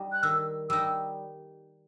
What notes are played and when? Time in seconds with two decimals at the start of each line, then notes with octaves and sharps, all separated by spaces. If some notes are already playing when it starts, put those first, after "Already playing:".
Already playing: G3 D#4
0.12 F#6
0.23 D#3 E6
0.70 G3 D#4 E6